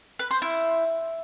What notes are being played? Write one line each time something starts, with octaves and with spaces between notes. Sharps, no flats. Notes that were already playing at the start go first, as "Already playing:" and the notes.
B4
C5
E4